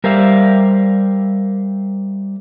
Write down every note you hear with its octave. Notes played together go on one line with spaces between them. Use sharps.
G3 A#4 C5 D5 E5 F5